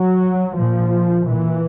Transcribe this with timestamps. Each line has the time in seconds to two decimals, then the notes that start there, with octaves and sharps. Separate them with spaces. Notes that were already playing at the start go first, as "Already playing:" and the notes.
Already playing: F#3
0.58 A#2 F3
1.27 A#2 E3